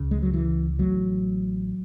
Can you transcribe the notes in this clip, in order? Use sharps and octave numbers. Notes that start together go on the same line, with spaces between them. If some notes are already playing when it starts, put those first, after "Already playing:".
Already playing: C#2 C#3
G#3
F#3
E3
A1 A2 F#3